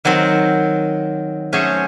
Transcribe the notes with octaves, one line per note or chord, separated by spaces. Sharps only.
D#3 F#3 C4
F#3 A3 C#4 G#4 C5